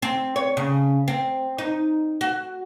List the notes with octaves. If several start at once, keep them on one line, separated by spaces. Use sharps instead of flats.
C4
C#5
C#3
C4
D#4
F#4